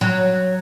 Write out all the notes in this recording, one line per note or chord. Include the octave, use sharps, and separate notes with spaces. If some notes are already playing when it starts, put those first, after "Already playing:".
F#3